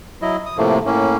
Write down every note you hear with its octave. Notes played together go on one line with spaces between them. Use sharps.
F#3 E4 D#5
D#6
A2 C3 F3 A3 A#3
A2 A#3 C#4